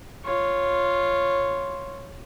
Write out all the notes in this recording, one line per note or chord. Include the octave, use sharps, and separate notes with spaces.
F4 C#5